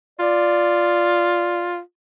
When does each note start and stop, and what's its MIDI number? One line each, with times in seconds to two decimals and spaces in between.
0.19 1.79 65
0.19 1.77 74